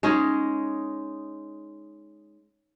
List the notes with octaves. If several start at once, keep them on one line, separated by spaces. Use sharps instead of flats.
G#3 C#4 D#4 G#4